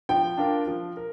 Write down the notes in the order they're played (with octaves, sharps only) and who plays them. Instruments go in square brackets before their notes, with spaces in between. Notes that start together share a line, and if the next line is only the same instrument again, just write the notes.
[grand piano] F3 [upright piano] G5
[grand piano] D4 F4 A#4
F3
A#4